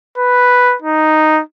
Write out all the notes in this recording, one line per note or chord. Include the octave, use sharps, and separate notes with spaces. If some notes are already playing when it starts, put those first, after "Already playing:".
B4
D#4